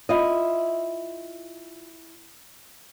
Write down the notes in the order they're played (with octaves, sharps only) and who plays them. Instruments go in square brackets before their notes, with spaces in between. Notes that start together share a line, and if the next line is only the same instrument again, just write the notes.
[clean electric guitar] E4 [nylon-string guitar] F4 D#5